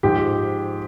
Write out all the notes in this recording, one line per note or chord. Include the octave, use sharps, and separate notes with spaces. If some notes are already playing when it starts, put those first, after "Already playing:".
G#2 F3 G#3 G4